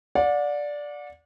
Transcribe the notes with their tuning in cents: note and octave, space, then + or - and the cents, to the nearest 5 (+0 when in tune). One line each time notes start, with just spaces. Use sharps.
D5 -5 F#5 -40